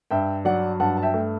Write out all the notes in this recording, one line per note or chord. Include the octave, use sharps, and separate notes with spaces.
G2 E5 G5
F#3 D5 F#5
G2 F#5 A5
A5
E5 G5
A3